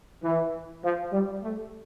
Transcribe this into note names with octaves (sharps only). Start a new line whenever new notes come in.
E3
F3
G3
A3